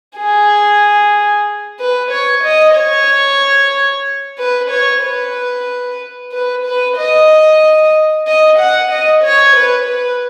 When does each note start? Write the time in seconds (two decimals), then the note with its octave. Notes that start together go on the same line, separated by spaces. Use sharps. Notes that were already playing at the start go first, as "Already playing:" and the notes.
0.17 G#4
1.79 B4
2.11 C#5
2.44 D#5
2.76 C#5
4.38 B4
4.70 C#5
5.02 B4
6.32 B4
6.65 B4
6.98 D#5
8.27 D#5
8.59 F#5
8.91 D#5
9.24 C#5
9.56 B4
9.88 B4